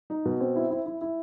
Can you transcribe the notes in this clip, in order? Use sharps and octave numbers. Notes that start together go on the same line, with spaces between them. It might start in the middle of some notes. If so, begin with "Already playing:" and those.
D#4
B2
C4
E4
E4
E4
E4